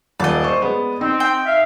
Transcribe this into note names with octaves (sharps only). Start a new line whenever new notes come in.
D#1 D5 D#5
C5 C#6
G#3 B3
C4 D#4
G5
E5 F5